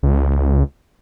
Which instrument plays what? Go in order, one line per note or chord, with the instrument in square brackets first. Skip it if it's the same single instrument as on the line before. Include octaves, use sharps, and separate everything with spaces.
[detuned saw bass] C#2